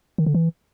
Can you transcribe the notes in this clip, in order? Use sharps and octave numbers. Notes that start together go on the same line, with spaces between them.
D#3
D3
E3